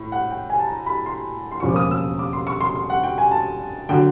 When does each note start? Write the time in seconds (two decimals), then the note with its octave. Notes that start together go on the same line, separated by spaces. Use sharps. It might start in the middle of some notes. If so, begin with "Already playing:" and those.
Already playing: A2
0.12 F#5
0.31 G5
0.50 G#5
0.59 A5
0.68 A#5
0.86 B5
1.06 C6
1.52 C6
1.60 E1 D#2 C#3 F3 C#6
1.69 D6
1.76 D#6
1.91 E6
2.19 D6
2.33 C6
2.47 C#6
2.61 C6
2.76 C6
2.90 F#5
3.03 G5
3.18 G#5
3.31 A5
3.89 D3 F#3 G5